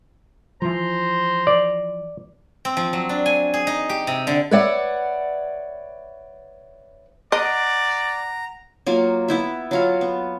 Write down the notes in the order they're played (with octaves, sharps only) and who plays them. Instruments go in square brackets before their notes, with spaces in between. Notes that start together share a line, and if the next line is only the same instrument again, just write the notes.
[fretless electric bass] E3 F3 [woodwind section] C5 A#5 C6
[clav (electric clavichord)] D5
[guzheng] C4
F3
F#3
D4
G#5
G#4
D#4
G4
C3
D3
[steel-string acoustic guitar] B4 C#5 D5 E5 F#5
[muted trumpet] D5 [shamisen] D#5 [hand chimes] F#5 F#6 D7 [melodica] A#5
[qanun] F#3 A#3 F4
B3 E4 E5
F#3 F4 F5
B3